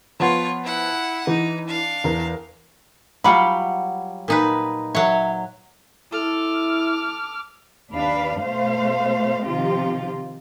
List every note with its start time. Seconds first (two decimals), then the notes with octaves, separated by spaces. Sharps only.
0.20 F3 B3 F4 C#5
0.64 E4 F#5
1.27 E3 D#4
1.68 D4 F5
2.04 E2 A#4
3.24 F#3 G3 F4 F#5 B5
4.28 A#2 D#4 B4
4.95 F#3 C#5 E5
6.12 E4 A4 D6 F6
7.90 D#2 D4 B4 F5
8.40 B2 A3 C5 F5
9.44 C3 D#3 F3 C4 F4 G4